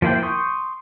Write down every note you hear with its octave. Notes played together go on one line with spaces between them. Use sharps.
F3 A#3 E4 C5 G5
C6 C#6 D#6 G6